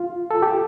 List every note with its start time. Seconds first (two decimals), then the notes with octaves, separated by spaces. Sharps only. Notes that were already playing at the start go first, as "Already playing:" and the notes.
Already playing: F4
0.31 A4
0.42 G4